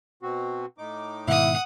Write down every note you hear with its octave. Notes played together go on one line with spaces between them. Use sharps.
B2 C4 F#4
A2 D#4 D6
G#2 B2 D#3 E4 F#5 D#6